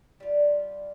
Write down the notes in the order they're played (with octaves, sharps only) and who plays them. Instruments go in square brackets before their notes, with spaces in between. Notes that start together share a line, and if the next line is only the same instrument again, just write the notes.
[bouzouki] G3 F4